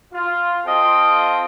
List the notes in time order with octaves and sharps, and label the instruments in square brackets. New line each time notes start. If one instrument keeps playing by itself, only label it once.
[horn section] F4
C4 F4 A4 D#5 F5 G5